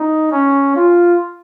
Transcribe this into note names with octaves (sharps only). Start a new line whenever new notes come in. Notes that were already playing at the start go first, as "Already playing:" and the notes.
Already playing: D#4
C#4
F4